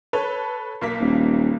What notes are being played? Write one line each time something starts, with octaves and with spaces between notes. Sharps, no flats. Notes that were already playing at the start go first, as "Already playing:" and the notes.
A4 B4 C#5
B1 A#3 B6
D#1